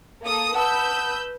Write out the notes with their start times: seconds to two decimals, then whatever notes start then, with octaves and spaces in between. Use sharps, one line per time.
0.23 A#3 A4 D#6
0.55 B4 F#5 A5 D#6 E6 G6